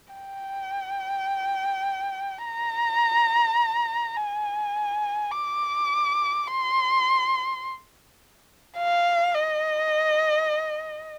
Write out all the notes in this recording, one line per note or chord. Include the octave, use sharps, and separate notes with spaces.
G5
A#5
G#5
D6
C6
F5
D#5